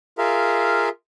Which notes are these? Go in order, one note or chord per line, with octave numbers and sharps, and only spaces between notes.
F4 G#4 A#4 E5 F5